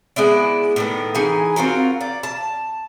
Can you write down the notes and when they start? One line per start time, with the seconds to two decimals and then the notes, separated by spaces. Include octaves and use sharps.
0.16 G#3 B3 E4 D5
0.76 A2 D#3 B3
1.15 E3 D#4 G#4 G#5
1.56 C4 F4 F#4 A#4
2.01 D5
2.23 A5